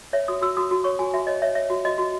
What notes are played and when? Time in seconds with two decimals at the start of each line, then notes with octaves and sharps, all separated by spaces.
0.13 C#5 E5
0.28 F#4 D#6
0.42 F#4 E6
0.57 F#4 D#6
0.71 F#4
0.84 C#5 C#6
0.99 F#4 G#5
1.13 F#4 E5
1.27 C#5 D#5
1.42 C#5 E5
1.55 C#5 E5
1.70 F#4
1.85 F#4 D#5
1.98 F#4